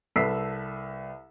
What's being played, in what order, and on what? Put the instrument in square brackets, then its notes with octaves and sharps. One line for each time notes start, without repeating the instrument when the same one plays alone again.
[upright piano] C2 A4 B4 E6 B6 C7